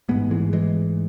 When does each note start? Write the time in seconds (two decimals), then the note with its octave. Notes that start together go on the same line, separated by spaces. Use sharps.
0.09 A1 G#2 G#3 B3
0.31 E3 G#3
0.53 E3 G#3